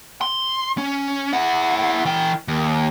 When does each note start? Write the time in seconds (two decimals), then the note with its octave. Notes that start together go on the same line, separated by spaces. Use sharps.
0.21 C6
0.78 C#4
1.33 E4 F#5
2.05 E3 G5
2.48 D#2